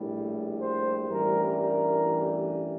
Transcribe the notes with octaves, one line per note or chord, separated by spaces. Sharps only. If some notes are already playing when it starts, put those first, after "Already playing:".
Already playing: A#1 A2 G3
C5
A1 G2 E3 G3 A#4
A#4